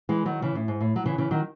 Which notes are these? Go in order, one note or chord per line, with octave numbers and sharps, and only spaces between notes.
E3 G#3
D#3 F#3
C#3 E3
A2
G#2
A2
F#3
C#3 E3
C#3 E3
D#3 F#3